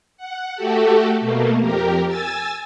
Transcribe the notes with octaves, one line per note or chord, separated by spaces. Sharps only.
F#5
A3 F#4 G4 A4
B2 A3 A#3
F2 G4 A#4
G#5 E6 A6